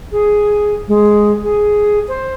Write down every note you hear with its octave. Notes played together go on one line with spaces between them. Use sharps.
G#4
G#3
G#4
C5